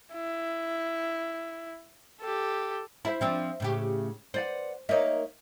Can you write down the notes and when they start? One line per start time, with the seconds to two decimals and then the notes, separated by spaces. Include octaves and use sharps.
0.13 E4
2.21 G4 A4
3.05 E4 C5 E5 B5
3.21 F3 C4 D4
3.60 A2 C#3 G4
4.34 B4 C5 D5 F#5
4.89 A#3 D#4 C#5 D#5 E5